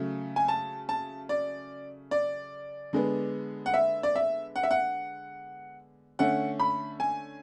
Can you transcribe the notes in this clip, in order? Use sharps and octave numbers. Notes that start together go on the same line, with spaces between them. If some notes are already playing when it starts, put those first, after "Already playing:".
Already playing: C#3 F#3 A3
G#5
A5
A5
D5
D5
D3 G#3 B3
F#5
E5
D5
E5
F#5
E5
F#5
D3 A3 C#4 F#5
B5
G#5